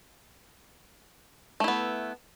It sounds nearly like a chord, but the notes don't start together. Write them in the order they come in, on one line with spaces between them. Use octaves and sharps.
A3 E4 B3